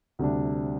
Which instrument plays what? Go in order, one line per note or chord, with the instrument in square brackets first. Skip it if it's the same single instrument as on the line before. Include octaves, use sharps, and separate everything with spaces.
[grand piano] D2 C3 G3 D4